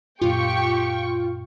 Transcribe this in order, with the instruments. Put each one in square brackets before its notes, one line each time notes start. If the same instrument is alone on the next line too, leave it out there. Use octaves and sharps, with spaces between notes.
[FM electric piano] F#2 A#2 [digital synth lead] F4 [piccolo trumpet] G4 [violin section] G5 C#6